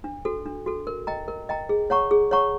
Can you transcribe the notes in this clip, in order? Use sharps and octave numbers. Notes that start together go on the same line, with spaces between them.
D4
F#4 A4
D4
F#4 A4
A#4
D#5 G5 A#5
A#4
D#5 G5 A#5
G#4
C#5 F#5 A#5 C#6
G#4
C#5 F#5 A#5 C#6